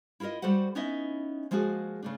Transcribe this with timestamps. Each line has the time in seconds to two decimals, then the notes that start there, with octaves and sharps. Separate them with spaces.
0.20 E4 F4 A4 A#4 D#5
0.42 G3 F#4 A4 C5 F#5
0.75 B3 C#4 D#4 E4 D#5 E5
1.51 F3 G#3 A#3 F#4 G#4
2.03 C#3 A3 D4